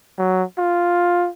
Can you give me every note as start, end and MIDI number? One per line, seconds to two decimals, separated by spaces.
0.18 0.44 54
0.58 1.30 65